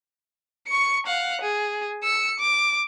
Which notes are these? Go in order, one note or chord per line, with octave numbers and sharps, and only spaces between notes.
C#6 C#7
F5 F#5
G#4
E6 C#7
D6